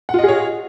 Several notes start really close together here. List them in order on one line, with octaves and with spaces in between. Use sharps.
F#5 F4 D#5 G#4 C#5